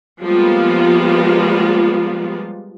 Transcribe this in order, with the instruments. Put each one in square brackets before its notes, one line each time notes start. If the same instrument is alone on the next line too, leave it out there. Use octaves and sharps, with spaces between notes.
[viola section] F3 G3 G#3 A#3 B3 F4